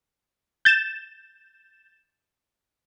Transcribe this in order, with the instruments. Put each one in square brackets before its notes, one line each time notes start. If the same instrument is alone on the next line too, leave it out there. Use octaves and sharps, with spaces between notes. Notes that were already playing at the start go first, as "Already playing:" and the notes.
[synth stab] G6 A6 E7